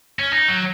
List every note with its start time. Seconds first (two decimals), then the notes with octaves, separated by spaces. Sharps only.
0.19 C#4
0.33 D#4
0.48 F#3